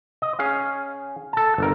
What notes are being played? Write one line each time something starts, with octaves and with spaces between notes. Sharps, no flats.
D#5
C#4 G#4 F5
A4 A5
G1 A#4